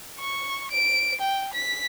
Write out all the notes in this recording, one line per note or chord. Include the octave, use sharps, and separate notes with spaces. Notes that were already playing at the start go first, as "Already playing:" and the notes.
C#6
D7
G5
B6